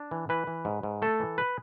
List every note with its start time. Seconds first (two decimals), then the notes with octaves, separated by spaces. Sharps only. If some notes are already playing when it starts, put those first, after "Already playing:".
Already playing: D4
0.11 E3
0.29 E3 B4
0.47 E3
0.65 G#2
0.83 G#2
1.02 A3 A4
1.20 E3
1.38 B4